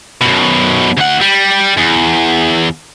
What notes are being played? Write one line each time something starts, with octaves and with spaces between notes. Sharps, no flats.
F#2 B2
D2 F#5
G3
E2